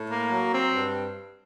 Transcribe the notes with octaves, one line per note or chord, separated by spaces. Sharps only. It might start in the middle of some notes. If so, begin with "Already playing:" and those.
Already playing: A2
A#3
F#3
C4
G2